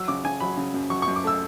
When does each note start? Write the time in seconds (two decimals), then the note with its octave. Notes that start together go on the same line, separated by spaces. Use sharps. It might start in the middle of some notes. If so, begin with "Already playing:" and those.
Already playing: F#3 E6
0.08 C#3 D6
0.24 C#3 G#5
0.40 F#3 B5
0.57 C#3
0.74 F#2
0.90 F#3 C#6
1.02 C#6
1.07 F#2
1.16 D6
1.24 A3 E6